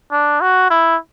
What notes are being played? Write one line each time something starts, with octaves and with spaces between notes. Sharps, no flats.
D4
F#4
E4